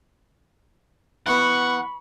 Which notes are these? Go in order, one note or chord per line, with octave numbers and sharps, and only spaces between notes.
E3 B3 F#5 B5 C#6